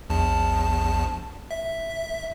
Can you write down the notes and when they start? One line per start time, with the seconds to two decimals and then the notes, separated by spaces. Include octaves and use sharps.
0.10 A#1 E2 A5
1.51 E5